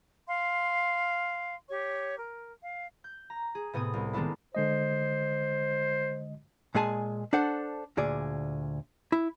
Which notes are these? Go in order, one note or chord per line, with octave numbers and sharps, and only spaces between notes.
F5 C6
G4 C#5 C#6
A#4
F5
G6
A#5
G#4
A2 C3 B3 C4 G#5 D#6
C2
D#3 G#3 A3 B3 D4 E4
D3 G#3 C5 D#5
A#2 G#3 G#4 G#5 A5
D4 A4 C5 F#5
D2 A#2 G#4 D5
E4